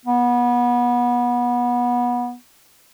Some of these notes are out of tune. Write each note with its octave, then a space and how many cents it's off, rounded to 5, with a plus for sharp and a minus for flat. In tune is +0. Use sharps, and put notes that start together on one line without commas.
B3 -25